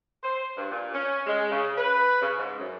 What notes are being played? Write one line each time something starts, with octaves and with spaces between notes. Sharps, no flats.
C5
G2
A#2
C#4
G#3
C#3
B4
C#3
G#2
F#2